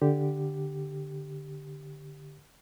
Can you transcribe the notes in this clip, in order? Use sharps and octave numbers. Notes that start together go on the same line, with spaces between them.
D3 G4